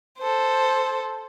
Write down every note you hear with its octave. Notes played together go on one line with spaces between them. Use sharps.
A4 C5